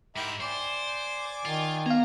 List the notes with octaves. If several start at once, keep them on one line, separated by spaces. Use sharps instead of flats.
G#2 E4 G4 A#4
C5 D5 G#5 D6
D#3 F4
B3 F5 A#5